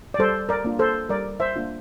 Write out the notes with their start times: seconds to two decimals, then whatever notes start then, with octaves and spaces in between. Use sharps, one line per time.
0.14 D5
0.19 G3 A4 C5
0.49 A#4 D5
0.65 A#3 D4 F4
0.79 A4 C5
1.09 G3 A#4 D5
1.40 C5 E5
1.56 A#3 D4 F4